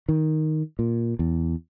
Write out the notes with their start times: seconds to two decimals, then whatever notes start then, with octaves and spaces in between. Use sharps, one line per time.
0.09 D#3
0.79 A#2
1.19 E2